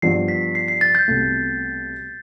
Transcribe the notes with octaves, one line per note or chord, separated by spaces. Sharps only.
G2 F3 B3 C7
B6
C7
C7
A6
G6
C2 B2 A3